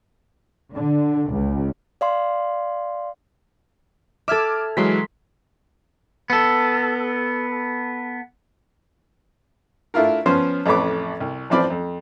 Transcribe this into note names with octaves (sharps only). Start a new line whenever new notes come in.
D3
C#2
D5 F5 C6
A4 E5 D6 F6 G#6
E3 F#3 G#3 C6 B6
B3 A4
A3 D4 E4 F4 A#4
F3 B3 C#4 C5
A1 F2 A3 B4 C#5 D6
C2
A1 E3 F3 C4 D5 B5
F2